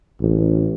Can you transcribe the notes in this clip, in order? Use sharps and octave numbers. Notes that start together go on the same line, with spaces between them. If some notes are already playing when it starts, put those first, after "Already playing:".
A1